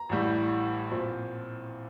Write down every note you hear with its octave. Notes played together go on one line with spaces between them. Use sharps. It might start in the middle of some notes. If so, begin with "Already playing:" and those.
Already playing: A#5
A1 A2 G3
A#2 F3 C4